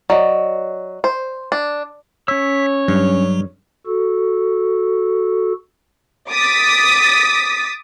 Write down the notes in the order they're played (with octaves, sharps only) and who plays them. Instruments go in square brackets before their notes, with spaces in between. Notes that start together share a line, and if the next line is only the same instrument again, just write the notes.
[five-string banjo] F#3 [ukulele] D5 D#5
[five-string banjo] C5
D4
[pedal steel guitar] C#4 E6 [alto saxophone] C#5 [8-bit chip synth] B6
[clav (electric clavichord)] G2 [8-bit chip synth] F#3
[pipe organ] F#4 A4
[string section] D6 D#6 A6 B6